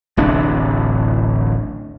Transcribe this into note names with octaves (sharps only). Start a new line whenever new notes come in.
D1 A1 C3 D4